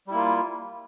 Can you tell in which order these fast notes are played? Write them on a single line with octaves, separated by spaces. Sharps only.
G3 E4 A#3 F4